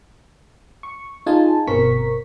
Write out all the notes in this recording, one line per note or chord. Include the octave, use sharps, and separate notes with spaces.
C#6
D#4 F4 G#4 G#5 A5
G1 B2 C4 A#4 C#6 B6